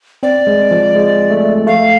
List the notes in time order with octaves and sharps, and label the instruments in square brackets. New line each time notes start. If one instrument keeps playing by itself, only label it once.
[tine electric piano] C4 [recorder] D5
[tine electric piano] G#3
F3
G#3
A3
[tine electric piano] A3 [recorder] F5